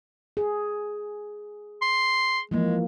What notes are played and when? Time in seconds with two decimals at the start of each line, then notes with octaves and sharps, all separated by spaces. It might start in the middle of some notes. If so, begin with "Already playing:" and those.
0.37 G#4
1.82 C6
2.51 E3 F3 G#3 A#3